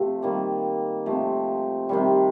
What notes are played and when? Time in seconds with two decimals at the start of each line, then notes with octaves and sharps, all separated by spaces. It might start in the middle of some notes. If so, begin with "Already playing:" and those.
Already playing: C3 F3 A3
0.22 D#3 G3 A#3
1.06 C3 F3 A3
1.89 C3 D#3 G3